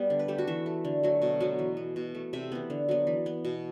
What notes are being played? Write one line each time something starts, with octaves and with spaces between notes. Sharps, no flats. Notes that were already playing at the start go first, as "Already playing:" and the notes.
Already playing: G3 B3
D3
B4
A3 G4
F#4
E3 E5
A3
D3
F#3 A3
B2
F#3 B3
E3
B3
B2
A3
C3 E5
E3 B3
D3
F#3 B3
E3
B3
B2